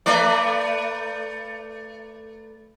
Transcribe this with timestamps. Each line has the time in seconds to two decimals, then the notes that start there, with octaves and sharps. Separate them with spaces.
0.06 A3 B4 D5